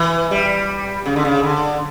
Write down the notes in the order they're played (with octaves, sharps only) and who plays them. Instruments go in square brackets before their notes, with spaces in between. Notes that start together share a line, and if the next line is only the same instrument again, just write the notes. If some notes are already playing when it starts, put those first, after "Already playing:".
Already playing: [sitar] E3
G3
C#3
D3
C#3
D3